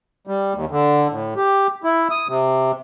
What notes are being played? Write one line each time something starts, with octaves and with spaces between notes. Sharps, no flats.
G3
D#2
D3
A2
G4
E4
D#6
C3